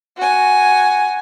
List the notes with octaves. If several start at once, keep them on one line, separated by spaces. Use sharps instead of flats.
F#4 G#5